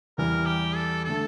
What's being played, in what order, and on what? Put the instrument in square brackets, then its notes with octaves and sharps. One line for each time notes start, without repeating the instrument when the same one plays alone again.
[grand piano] E2 E3 G3 [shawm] A#4
[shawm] G4
A4
[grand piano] D3 A3 [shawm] A4